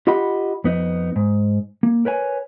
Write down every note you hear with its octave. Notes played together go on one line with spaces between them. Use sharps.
F4 G4 D#5 F#5 B5
F2 B3 D#4
G#2
A#3
A#4 B4 C#5 G#5